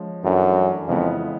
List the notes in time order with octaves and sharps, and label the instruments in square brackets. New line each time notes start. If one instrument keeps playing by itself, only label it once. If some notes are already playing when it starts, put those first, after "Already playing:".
Already playing: [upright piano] F3 G#3 C#4
[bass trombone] F#2 [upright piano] E3 A3 D4 F#4
[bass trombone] F2 [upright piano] C#3 E3 G#3 B3 E4